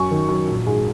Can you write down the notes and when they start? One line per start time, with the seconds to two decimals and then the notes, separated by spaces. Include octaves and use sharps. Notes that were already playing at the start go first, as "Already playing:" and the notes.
Already playing: F#2 G#5 C#6
0.11 D#3
0.29 F#2
0.47 A#1
0.66 G#2 G#4